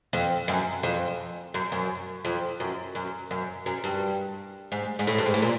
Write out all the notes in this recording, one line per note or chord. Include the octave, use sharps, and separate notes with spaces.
F2
F#2
F2
F#2
F#2
F2
F#2
F#2
F#2
F#2
G2
G#2
G#2
A2
G2
G#2
A2
A#2